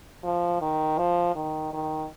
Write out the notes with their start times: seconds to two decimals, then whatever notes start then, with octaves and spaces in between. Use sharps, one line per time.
0.24 F3
0.61 D#3
0.98 F3
1.35 D#3
1.73 D#3